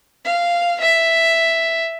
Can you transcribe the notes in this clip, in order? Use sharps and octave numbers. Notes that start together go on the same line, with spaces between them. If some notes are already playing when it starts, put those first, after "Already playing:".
F5
E5